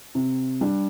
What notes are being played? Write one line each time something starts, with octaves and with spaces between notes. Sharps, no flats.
C3
G3 D4